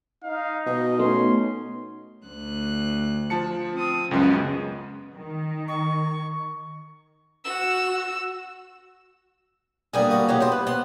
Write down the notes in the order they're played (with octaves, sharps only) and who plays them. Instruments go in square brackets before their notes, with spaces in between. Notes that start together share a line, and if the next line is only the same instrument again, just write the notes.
[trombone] D#4 [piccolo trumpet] F5
[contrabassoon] B2 [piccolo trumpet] D#5
[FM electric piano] A3 B3 D#4 [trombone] C#4 [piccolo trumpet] C6
[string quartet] D2 F#6
[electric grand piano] F3 A5 C#7
[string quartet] C4 D#6
[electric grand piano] C#2 F#2 G#3 [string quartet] C#3 B3
[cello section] D#3
[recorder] C#6
[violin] F#4 E6
[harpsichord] D3 A#3 [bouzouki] G3 B3 G#4
[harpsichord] A#3 F#4
[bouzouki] F#3 D#4 G4
[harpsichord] B3 [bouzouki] F4 C5
[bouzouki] B4
[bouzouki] B3 [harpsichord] C5